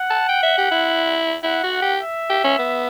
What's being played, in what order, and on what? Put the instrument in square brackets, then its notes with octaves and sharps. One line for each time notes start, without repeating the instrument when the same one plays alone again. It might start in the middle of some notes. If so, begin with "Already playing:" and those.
Already playing: [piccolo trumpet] F#5
[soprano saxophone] A5
G5
E5
G4
E4
[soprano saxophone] E4 [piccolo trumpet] F#5
[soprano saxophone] F#4
G4
[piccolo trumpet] E5
[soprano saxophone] G4
C#4
B3